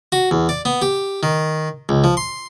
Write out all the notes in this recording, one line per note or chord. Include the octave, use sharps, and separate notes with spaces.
F#4
E2
D5
B3
G4
D#3
C#2
F3
C6